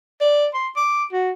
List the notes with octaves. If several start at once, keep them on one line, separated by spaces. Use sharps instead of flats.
D5
C6
D6
F#4